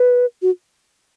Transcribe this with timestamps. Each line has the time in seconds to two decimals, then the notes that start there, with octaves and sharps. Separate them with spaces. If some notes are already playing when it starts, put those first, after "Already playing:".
Already playing: B4
0.42 F#4